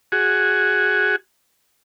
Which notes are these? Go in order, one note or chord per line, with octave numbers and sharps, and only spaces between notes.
F#4 G#4